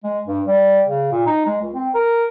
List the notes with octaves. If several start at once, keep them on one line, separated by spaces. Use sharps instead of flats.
G#3
G2
G3
C#3
A#2
D#4
G#3
C#2
C4
A#4